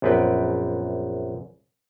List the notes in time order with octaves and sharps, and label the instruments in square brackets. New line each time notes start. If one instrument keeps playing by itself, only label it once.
[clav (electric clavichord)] A#1 F#2 B3 C4 B4 G5